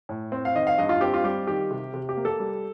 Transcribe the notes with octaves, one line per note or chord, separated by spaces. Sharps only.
A2
C4
F5
D#3 D#5
F5
G2 D#5
F4
C4 G4
F4
G3 G4
D#3 G4
C3
C3
G4
A#3
A4
G3